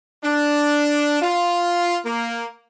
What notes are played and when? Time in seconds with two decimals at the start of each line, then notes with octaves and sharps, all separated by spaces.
0.24 D4
1.22 F4
2.05 A#3